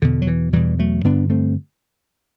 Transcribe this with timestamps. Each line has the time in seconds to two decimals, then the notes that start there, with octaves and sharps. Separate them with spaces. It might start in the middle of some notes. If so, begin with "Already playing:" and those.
0.02 E2 B2 D3
0.22 F#3
0.27 E3
0.53 E2 B2 E3 G3
0.79 F#3 A3
1.04 G2 D3 B3 D4
1.30 A3 C4